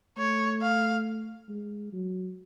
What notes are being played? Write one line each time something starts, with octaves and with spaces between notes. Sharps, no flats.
A3 C#5
F5
G#3
F#3